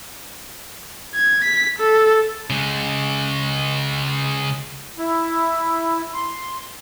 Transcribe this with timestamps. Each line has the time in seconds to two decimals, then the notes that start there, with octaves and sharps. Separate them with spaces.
1.15 G#6
1.44 B6
1.79 A4
2.50 C#3 G#3
4.99 E4
6.14 C6